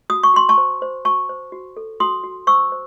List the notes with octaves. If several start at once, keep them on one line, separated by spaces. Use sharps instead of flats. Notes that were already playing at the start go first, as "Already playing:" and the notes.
F#4 D#6
C#6
F#4 C6
A5 C#6
C5
C5
F#4 A5 C#6
C5
F#4
A4
F#4 C6 D#6
F#4
C5 C#6 E6
C5